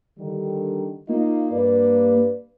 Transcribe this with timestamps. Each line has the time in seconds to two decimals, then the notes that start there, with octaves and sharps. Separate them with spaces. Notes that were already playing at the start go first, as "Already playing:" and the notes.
0.19 D3 D#3 G3
1.09 A#3 D#4 F4 D#5
1.51 G2 B4 D5